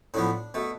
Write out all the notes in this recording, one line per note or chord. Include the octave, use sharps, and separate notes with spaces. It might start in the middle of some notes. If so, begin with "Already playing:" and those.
A2 F3 B3 D4
B2 A3